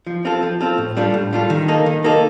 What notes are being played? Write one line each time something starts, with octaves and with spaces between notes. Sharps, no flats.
F3
C4 F4 A4
F3
C4 F4 A4
A2
G3 D4 F4 A4
A2
G3 D4 F4 A4
D#3
A#3 D#4 A4
D#3
A#3 D#4 A4